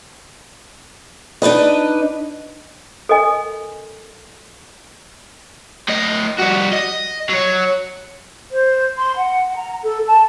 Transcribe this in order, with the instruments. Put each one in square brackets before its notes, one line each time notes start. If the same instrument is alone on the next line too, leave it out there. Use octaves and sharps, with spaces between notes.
[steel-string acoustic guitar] D4 D#4 B4 D#5
[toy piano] A4 A#4 D#5 G#5
[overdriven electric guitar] A2 D#5
G3 F#4
D#5
F#3 C#5
[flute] C5
C6
F#5
A#5
A4
A5